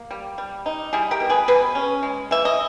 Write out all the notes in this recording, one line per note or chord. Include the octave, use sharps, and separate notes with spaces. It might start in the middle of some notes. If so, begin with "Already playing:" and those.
Already playing: A#3
G3
G3
D#4
G3 E4 G#4
G4 A#4
B2
G#4 B4
B2 G#4 B4
C#4
G#3
E3 E5
D#5